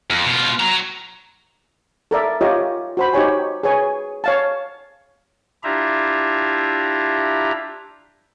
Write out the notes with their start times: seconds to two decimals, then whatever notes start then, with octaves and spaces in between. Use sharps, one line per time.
0.10 F2
0.26 B2 F4
0.60 F#4 A#5
2.11 A4 A#4 D5 E5
2.41 F4 G4 A#4 C#5 D#5
2.97 F#4 C5 B5
3.13 D#4 G4 C#5 G#5
3.63 G#4 B4 C#5 G#5
4.24 C#5 F5 A5
5.64 D4 E4 F4 G4 E5 A#5